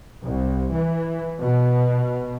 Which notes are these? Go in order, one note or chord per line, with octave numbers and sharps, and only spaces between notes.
C2
E3
B2